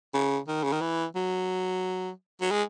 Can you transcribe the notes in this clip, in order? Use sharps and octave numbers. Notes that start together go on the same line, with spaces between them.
C#3
D#3
C#3
D#3
E3
F#3
F#3
G#3